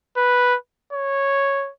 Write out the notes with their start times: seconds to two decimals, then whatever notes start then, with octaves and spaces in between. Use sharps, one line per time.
0.17 B4
0.93 C#5